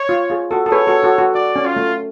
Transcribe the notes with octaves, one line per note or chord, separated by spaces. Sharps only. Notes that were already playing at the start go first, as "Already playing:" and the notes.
Already playing: C#5
F4
F4 G#4
F#4 A4
A4
G#4 B4 C#5
F#4 A4
F#4 A4
F#4
F#4 D5
C#4
F4
A3